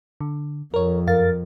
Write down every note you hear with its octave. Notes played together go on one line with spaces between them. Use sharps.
D3
F2 A#4 C#5
F#2 A#4 F5 A6